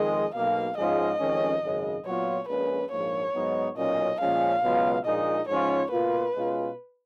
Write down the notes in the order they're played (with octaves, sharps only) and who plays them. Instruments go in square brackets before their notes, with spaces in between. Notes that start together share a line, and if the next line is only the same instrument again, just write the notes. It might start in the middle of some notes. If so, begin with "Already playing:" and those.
Already playing: [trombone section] F2 D#3 G#3 [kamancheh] D#5
[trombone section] B1 B2 A#3 [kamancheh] F5
[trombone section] G#2 F3 G#3 C#4 F4 [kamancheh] D#5
[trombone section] F2 D#3 G#3 C#4
G#1 F#2 C#3 G#3
[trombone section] A#2 F#3 B3 F4 [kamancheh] C#5
[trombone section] A#1 A#2 G#3 C#4 [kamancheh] B4
[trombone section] A#1 G#2 F3 A#3 [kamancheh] C#5
[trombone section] G#2 F#3 B3 D#4
[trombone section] B1 A#2 F#3 C#4 [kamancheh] D#5
[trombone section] A#2 F3 G#3 C#4 [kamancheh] F5
[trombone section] C#2 B2 F#3 B3 F4
[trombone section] A#1 A#2 G#3 D#4 [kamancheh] D#5
[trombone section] G#2 F3 G#3 C#4 F4 [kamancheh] C#5
[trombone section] B2 A#3 F4 [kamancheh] B4
[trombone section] B2 G#3 C#4 F4